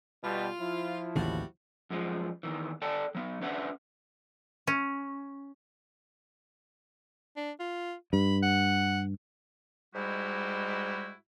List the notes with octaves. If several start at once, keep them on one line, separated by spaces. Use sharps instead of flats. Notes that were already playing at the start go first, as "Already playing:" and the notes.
B2 G3 F4
F3 E4
A1 D#2 C#3 G3 F#4 E5
F#2 F3 G#3
E2 D#3 E3
A4 D5 G5 A5
F#3 B3
C#4 D4 B4 E5 F#5
C#4
D4
F4
G2 B5
F#5
G#2 G3 G#3 E4 F#4 G4